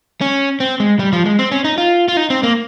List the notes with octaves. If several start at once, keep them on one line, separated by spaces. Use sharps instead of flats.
C#4
C4
G#3
G3
F3
G#3
C4
C#4
D#4
F4
F4
D#4
C4
A#3